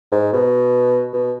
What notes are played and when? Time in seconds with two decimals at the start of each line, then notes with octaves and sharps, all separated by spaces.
0.12 G#2
0.33 B2
1.13 B2